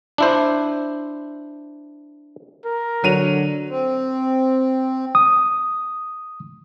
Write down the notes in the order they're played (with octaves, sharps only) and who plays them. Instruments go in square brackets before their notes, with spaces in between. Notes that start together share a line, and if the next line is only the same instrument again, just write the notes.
[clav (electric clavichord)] D4 E4 C5
[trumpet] A#4
[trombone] D3 [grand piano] F#3 D#7 F7
[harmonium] C4
[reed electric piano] D#6